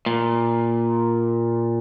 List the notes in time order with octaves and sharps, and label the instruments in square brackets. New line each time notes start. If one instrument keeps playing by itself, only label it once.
[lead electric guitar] A#2